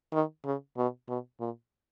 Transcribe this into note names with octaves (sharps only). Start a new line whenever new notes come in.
D#3
C#3
B2
B2
A#2